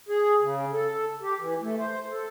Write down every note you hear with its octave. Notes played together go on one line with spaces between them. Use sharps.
G#4
C#3
A4
G4
E3
A3
C5
A4